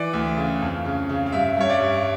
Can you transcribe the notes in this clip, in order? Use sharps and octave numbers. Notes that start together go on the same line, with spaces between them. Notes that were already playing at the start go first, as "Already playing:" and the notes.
Already playing: E3 D5
D2
C#3
F2
C#3
C#3
F5
G2 E5
G2 C#5
D5
G2